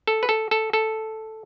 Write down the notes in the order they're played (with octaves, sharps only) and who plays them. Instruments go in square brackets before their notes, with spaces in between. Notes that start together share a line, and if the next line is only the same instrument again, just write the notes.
[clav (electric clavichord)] A4
B4
A4
A4
A4